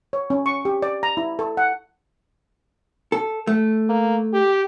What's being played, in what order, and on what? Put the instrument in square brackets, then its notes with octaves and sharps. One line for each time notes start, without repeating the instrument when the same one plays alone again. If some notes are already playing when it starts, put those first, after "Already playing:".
[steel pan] C#5
C#4
C#6
G4
D5
A#5
E4
A4
F#5
[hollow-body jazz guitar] A4
A3
[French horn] A#3
G4